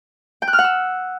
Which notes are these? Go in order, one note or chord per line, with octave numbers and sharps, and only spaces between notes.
G5
F#6
F6
F#5
E6